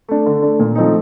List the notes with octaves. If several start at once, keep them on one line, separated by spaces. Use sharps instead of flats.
A3 D4
D3
A3 D4
A#2
F3 A3 C4 D#4